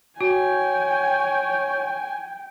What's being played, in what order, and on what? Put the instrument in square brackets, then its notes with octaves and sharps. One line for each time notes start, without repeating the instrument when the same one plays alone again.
[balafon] F#4 [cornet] C#5 [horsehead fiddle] G5 [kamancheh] G#5